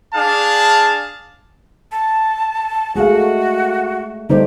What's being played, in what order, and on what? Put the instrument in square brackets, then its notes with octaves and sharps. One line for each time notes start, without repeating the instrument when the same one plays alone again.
[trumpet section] D4 G#4 F5 A5
[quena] A5
[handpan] G#3 A3 [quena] F#4 [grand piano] G#4 F5
[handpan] D3 G3 A3 [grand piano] D#4 C5 [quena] G4